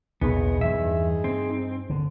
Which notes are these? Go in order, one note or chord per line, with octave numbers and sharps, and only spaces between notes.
B1 E2 A2 B3 D#4 G#4
E2 G2 E5
C4
D3